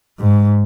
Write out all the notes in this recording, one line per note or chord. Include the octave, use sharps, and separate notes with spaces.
G#2